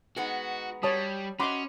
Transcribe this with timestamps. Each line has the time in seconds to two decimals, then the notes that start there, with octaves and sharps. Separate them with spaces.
0.16 G#3 B3 D#4 F#4
0.83 G3 C#5 A5 D#6
1.40 C#4 F#4 D#5 B5 C6 D6